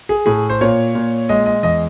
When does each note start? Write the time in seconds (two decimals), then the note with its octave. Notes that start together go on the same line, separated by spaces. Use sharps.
0.09 G#4
0.26 A2 G#4
0.50 C5
0.61 A#2 C#5
0.95 A#2
1.29 G#3 D#5
1.46 D#5
1.63 E2 D#5